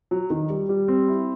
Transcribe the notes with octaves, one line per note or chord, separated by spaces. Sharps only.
F#3
D#3
G3
G3
C4
E4